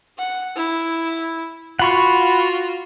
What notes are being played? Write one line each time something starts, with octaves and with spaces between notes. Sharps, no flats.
F#5
E4
F4 F#4 F#5 B5 C#6